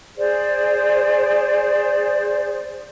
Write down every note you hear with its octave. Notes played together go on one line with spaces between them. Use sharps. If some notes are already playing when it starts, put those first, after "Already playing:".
G#4 C5 D5